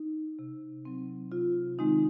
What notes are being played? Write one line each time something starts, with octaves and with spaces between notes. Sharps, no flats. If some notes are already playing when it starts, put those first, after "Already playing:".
Already playing: D#4
C3
F#3 C4
C3 F4
D#3 G#3 C4 D#4